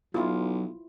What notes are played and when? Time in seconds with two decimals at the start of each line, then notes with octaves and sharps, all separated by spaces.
0.14 B1 F#3 E4 F4